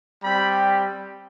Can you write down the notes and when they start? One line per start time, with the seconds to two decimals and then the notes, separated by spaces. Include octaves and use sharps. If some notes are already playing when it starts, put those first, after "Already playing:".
0.24 G3 C4 G4 B5